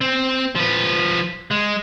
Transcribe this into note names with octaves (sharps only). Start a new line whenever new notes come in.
C4
F3 B4
G#3